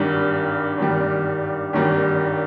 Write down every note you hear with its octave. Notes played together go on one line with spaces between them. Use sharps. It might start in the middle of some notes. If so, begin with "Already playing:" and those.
Already playing: G#1 G2 D#3 G3
G#1 G2 D#3 G3
G#1 G2 D#3 G3